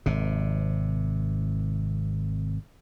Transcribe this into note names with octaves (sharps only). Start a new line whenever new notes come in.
G#1 C3